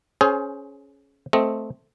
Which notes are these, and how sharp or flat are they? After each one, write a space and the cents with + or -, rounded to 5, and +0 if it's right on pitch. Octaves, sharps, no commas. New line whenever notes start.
C#4 +0 G#4 +30 C5 +0
A3 +0 C4 +0 D#5 +15